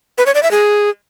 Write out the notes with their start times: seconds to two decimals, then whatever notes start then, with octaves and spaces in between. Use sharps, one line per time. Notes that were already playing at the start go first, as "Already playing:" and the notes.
0.18 B4
0.26 C#5
0.35 D5
0.43 E5
0.51 G#4